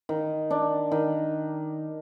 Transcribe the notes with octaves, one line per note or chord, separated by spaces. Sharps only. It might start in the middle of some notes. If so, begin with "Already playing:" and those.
D#3
D4
D#3